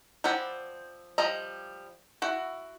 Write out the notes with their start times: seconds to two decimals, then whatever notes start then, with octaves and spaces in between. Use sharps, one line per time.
0.24 F3 C4 D5 F#5 B5
1.18 F3 G3 D#5 A#5
2.22 E4 F#4